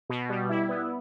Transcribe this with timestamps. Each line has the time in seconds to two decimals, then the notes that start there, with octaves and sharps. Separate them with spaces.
0.09 B2
0.29 G3
0.49 E4
0.69 B3